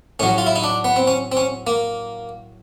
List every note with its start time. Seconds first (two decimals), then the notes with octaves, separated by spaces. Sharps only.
0.19 A2 F#3 C#4
0.38 F4
0.46 E4
0.56 D#4
0.64 D4
0.84 B3
0.96 C4
1.07 C#4
1.32 C4
1.37 C#4
1.67 A#3